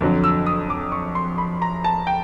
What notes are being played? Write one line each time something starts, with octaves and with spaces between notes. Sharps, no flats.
F2 D3 F#3
E6
D#6
D6
C#6
C6
B5
A#5
A5
G5